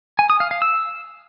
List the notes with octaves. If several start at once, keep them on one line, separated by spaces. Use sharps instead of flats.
G#5
D#6
F5
F5
E6